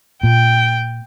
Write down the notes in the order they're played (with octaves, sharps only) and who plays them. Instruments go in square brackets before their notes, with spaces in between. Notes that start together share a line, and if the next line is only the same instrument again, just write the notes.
[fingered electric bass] A#2 [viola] G5